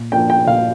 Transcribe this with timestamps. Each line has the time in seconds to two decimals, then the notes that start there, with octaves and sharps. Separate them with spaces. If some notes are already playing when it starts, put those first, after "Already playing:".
Already playing: A#2
0.12 F3 A#3 D4 G5
0.30 G5
0.47 A#2 F5